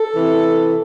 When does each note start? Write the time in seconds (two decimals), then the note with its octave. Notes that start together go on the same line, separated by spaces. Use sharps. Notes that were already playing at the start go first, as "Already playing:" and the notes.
Already playing: A4
0.14 C3 E3